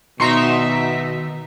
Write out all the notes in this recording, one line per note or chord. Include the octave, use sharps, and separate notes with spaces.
B2 D#3 D#4 F#4 E5 A#5 C6 C#6